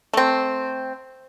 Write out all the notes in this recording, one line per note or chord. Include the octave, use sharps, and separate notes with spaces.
A3 C4